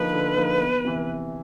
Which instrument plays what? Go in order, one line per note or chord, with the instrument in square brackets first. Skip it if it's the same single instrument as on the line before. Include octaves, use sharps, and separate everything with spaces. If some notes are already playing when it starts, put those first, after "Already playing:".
Already playing: [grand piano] D3 F3 A#3 D#4 [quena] B4
[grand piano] D3
F3 A#3 D#4
E2
C3 E3